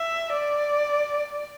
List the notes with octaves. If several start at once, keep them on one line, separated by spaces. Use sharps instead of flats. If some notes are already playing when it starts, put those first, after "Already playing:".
Already playing: E5
D5